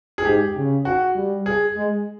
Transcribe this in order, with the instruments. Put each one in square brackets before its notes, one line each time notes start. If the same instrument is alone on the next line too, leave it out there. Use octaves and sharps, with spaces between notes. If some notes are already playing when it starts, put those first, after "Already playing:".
[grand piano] G#4
[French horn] G#2 [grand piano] G4
[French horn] C#3
[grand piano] F#4
[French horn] G3
[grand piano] G#4
[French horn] G#3